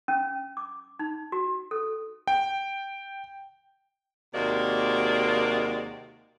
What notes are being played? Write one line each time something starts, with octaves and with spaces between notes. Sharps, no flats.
C#4
D6
D#4
F#4
A4
G5
D#2 C3 G#3 A#3 F#4 D5